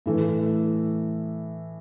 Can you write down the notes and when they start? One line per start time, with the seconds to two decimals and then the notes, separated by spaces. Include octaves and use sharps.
0.06 A2 E3 A3